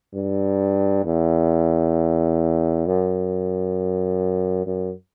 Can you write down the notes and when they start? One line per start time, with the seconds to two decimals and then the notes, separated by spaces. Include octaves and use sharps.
0.14 G2
1.05 E2
2.86 F#2
4.66 F#2